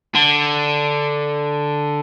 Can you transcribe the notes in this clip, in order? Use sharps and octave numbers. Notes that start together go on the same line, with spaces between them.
D3